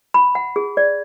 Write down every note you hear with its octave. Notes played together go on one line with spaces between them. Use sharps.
B5
F#5
G#4
D5